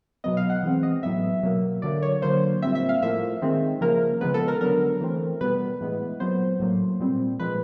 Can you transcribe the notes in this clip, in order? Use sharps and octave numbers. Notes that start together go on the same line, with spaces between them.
B2 F#3 B3 D#5
F5
F#5
E3 G#3 C4
D#5
A2 F#3 B3 E5
B2 F#3 A#3
D3 F#3 A#3 D5
C#5
D3 F#3 A#3 C5
A#2 G3 C4 E5
E5
F5
A2 F3 A#3 E5
D#3 G#3 C4
C#3 F3 A#3 A#4
C#3 F3 G#3 B3 B4
A4
A#4
D3 F#3 B3 A#4
E3 A3 C4
B2 G3 B3 B4
A2 E3 G#3 B3
A#2 F#3 B3 C5
A2 F#3 A#3
A#2 G3 C4
A#2 F3 G#3 B4